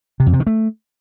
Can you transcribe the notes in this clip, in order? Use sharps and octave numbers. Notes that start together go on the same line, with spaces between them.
C3
F2
C3
D#3
A3